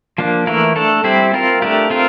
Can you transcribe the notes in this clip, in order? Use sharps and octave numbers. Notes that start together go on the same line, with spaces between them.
F3 A#3 D4
E3 A3 E4 A#4
A3 D4 A4
G3 C4 E4 G4 C5
C4 F4 A#4
A3 D4 G4 A#4
C4 F4 A#4